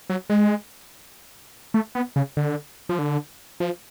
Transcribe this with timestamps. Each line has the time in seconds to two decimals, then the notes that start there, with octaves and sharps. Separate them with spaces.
0.10 F#3
0.30 G#3
1.74 A3
1.95 B3
2.16 C#3
2.37 D3
2.89 F3
2.99 D3
3.60 F3